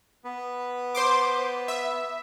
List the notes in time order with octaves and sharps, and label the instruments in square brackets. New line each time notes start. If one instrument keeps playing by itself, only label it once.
[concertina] B3 B4
[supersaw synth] C5 C6 D6
E5